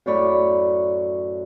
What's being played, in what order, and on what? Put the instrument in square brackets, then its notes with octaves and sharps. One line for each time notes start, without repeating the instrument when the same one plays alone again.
[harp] F#2 A2 C#5 D5 B5